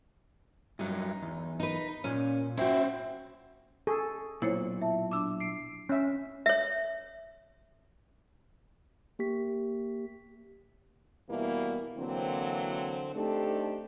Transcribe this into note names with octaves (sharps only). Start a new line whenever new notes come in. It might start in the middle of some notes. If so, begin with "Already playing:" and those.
G2 F#3 D#4
E2
D#4 B4
A#2 C#4
C#4 E4 F#4 C5 G5
G#4 A4 C#6
B1 A#2 E4 C5 C#5
E5 A5
D4 E5 D6 E6
C7 D7
C#4 E5
C#5 E5
A#3 G4 B6
B2 E3 G3 A#3 E4
D3 E3 F#3 A#3 C4
A3 C4 D4 D#4 G4 A4